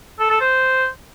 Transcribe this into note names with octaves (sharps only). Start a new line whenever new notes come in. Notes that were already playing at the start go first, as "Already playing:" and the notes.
A4
A4
C5